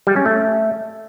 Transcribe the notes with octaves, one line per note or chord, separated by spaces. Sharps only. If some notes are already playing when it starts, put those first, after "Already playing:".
G3
C#4
A3